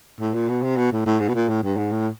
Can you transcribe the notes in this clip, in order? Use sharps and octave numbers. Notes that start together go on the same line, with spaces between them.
A2
A#2
B2
C3
B2
A2
A2
G#2
B2
A#2
A2
G2
G#2
A2